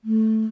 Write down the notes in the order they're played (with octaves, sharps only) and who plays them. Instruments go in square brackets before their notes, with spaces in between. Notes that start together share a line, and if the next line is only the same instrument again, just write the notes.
[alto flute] A3